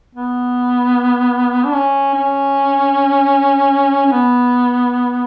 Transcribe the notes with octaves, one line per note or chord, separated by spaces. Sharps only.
B3
D4
C#4
C#4
C#4
B3